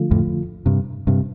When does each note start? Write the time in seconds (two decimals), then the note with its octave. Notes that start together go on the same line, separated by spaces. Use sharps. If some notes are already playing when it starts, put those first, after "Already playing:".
Already playing: D3 F3 A3 F4
0.11 F2 A2
0.66 G2 C3
1.07 G2 C3